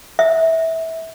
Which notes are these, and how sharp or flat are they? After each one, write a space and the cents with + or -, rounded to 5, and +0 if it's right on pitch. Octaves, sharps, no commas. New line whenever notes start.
E5 -20